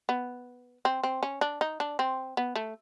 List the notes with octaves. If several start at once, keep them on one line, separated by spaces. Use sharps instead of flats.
B3
C4
C4
C#4
D4
D#4
D4
C4
B3
A3